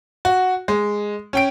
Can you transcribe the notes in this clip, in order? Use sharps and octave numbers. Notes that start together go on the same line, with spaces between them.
F#4
G#3
C#4 G5 D7